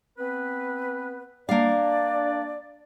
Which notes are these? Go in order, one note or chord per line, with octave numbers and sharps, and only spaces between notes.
B3 C4 B4
A#3 D4 D5 F5